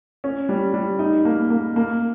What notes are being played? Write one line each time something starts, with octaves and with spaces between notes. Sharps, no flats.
C#4
G3
G3
D#4
A#3
A#3
A#3